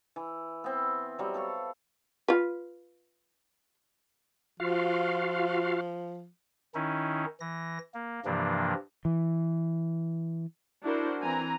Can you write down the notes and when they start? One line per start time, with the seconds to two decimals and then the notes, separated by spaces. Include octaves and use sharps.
0.16 E3
0.64 B3 C4
1.19 F#3 G3
1.34 A4 F5 C#6
2.28 F4 B4
4.60 F3 F4 F#4 F5
6.75 D#3 C#4 D#4 E4
7.40 E3 A#6
7.94 A#3
8.25 G2 C3 E3 F3 A#3 D4
9.05 E3
10.84 D4 E4 F#4 A#4 C5
11.22 E3 C4 G#5 A#5